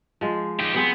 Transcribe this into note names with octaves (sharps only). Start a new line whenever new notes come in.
F3 G#3
D#4 G4
B3 C4 G#4 C5